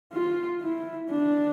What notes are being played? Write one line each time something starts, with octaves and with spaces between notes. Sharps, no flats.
F4
E4
D4